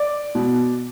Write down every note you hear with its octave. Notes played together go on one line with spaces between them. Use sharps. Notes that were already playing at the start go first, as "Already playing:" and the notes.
Already playing: D5
B2